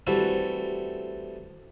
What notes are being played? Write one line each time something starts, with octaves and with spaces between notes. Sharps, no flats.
E3 G3 A3 C4 F#4 A4